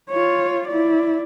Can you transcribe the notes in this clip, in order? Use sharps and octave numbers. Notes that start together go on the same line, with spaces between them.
F4 C#5
E4 D5